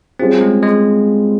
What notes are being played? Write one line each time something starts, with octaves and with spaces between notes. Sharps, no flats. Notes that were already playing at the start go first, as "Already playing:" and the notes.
G3 C4 C#4 F4 G#4 C5
G#3
G#3